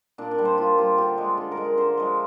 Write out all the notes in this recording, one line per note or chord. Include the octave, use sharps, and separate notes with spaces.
A#2 D4
D4
G3
C5
A#2 F4
G3 G4
D3 G4
G#3
D3
A#4
G#3
A#4
D3 C5
F3 G#3